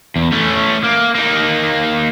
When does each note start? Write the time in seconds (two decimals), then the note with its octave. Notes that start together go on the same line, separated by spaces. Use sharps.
0.16 E2
0.32 A3 C#4
0.84 A#3
1.15 A#3 D#4